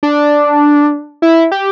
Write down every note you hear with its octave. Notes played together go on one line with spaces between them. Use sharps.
D4
E4
G4